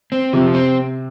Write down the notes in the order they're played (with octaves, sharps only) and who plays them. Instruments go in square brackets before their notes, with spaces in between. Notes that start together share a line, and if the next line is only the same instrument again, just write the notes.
[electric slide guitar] C4
[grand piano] C3 [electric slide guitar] F3
[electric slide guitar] C4